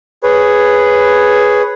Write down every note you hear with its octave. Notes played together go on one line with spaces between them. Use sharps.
G#4 B4 C#5